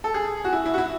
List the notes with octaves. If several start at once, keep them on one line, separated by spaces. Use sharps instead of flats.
A4
G#4
F#4
E4
E4
F#4
E4